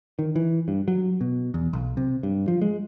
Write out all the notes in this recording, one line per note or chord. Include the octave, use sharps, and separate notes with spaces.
D#3
E3
G2
F#3
B2
E2
B1
C3
G2
F3
G#3